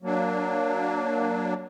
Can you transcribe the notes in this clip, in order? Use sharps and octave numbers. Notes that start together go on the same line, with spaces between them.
F#3 A#3 D4